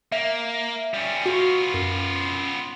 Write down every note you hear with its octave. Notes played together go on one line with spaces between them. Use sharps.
A#3 E5
G3 C#4
B3 F4 F#4
F#2